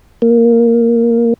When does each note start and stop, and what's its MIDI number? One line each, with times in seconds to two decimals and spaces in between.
0.22 1.33 58